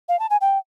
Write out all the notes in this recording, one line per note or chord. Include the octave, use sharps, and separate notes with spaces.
F5
A5
G#5
G5